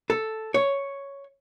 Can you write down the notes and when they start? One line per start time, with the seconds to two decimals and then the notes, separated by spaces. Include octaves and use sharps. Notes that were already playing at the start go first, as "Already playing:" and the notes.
0.10 A4
0.54 C#5